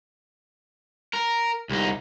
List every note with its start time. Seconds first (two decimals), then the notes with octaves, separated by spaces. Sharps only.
1.13 A#4
1.69 C2 D#4